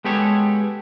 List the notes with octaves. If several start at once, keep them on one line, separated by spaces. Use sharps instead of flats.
G#3 B3 G4 A4 C#5